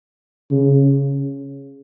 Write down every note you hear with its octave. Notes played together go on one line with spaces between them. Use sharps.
C#3